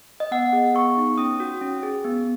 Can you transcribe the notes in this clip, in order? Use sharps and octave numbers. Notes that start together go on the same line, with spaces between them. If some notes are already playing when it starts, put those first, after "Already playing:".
D#5
B3 F#5
G#4
B3 C#6
D#4
C#4 D#6
F#4
C#4
G#4
B3